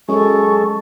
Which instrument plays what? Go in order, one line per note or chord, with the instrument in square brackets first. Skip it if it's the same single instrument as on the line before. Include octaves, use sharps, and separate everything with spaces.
[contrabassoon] F#2 [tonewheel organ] G#3 [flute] A4 [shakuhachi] C#6